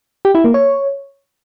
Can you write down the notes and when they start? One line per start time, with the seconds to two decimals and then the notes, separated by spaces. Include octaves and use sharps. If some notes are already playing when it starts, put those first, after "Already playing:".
0.25 G4
0.35 E4
0.44 A#3
0.54 C#5